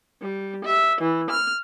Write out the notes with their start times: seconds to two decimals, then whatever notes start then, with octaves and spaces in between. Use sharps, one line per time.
0.22 G3
0.64 E5
1.00 E3
1.30 F6